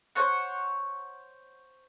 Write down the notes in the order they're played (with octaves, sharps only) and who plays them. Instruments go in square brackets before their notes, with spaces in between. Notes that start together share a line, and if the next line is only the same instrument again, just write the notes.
[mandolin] C5 C#5 F#5